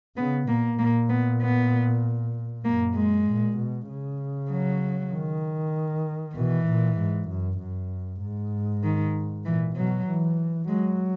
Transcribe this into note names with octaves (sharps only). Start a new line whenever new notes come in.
C#3 B3
A#2 A#3
A#2 A#3
B3
B3
F#2 A#3
G#3
A#2
B2
C#3
F#3
D#3
B2 E3
A#2
G#2
F#2
F#2
G#2
D#3
A#2 E3
B2 F#3
E3
F#3 G#3